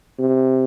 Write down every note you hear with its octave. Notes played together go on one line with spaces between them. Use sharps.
C3